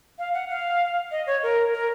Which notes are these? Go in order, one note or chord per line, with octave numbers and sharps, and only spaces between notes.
F5
F#5
F5
D#5
C#5
A#4
A#4